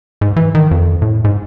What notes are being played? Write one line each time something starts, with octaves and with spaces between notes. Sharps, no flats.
G#2
E3
D#3
F2
A2
G#2